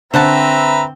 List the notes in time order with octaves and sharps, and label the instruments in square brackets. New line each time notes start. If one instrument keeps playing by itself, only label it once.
[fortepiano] D3 [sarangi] C4 [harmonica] B4 E5 A#5 [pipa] C5 F#5 A5